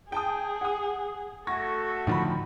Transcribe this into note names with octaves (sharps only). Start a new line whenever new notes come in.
G#4 G5 A5 D#6
F#5 D#6
A3 F#4 A4 C#6 G#6 A#6
A2 D3 D#3 F3 B5